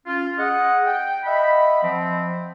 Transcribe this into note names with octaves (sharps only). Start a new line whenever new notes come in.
C#4 F4
G#4 D#5 F#5
G5
D#5 E5 F#5 B5
F3 C4